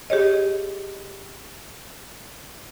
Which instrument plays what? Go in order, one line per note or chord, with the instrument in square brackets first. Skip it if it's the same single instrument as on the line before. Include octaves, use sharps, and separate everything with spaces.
[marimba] G4 G#4 C#5 D#5